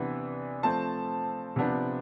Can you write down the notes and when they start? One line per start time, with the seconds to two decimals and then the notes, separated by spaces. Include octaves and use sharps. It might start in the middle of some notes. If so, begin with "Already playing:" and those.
Already playing: C3 E3 B3 D4
0.63 F3 A3 C4 A5
1.56 C3 F3 B3 D4